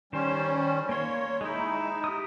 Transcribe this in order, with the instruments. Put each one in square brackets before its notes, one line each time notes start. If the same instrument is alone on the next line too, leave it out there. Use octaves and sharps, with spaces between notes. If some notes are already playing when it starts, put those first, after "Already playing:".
[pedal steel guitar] D#3 C5 [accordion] G3 C#4
[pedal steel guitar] A#3 C6 [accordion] C#5
[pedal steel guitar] G#3 E4 [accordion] D#4
[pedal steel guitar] G4 D#6